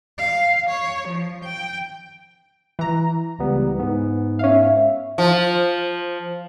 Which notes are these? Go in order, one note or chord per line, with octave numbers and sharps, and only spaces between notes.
F5
C#5
F3
G5
E3 A#5
C#2 G3 B3
G#2 B3
C#4 E5 F5
F3